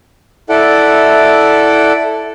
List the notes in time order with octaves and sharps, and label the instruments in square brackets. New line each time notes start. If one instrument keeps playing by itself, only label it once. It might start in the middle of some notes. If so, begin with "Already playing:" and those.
[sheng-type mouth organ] E4 A4 D5 F#5